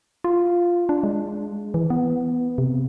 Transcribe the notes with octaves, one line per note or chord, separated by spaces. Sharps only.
F4
D4
G#3
E3
B3
C3